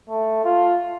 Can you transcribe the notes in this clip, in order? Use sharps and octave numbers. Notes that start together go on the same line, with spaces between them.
A3
F4